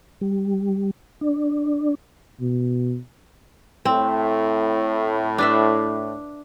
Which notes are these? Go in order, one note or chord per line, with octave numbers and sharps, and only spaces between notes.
G3
D4
B2
A2 C4
D4 B4 E5